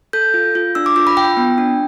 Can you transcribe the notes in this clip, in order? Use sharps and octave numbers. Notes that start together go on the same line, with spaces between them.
A4 G6
F4
F4
D4 E6
D6
F4 E6
B5
F4 G5
B3
D4